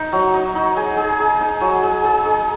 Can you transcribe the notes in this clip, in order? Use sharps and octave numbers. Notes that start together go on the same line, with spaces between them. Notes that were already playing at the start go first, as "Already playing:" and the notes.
Already playing: D#4
F#3
D#4
D#4
G#4
G#4
G#4
D#4
F#3
G#4
G#4
D#4